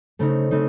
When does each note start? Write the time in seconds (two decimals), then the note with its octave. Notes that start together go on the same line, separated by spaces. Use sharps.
0.19 C#3 A3 C4 D#4
0.51 C#3 A3 C4 D#4